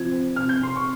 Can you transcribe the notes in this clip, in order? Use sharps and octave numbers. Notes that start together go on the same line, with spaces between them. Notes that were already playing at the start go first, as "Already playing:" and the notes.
Already playing: C3 F3 G#6
C4
C3 F6
G6
C3 C6
C#6